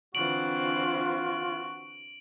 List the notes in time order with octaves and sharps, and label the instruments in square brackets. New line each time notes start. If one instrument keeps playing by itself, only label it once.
[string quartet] D3 E3 C4 [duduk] F4 [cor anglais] F#4 [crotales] D7 F#7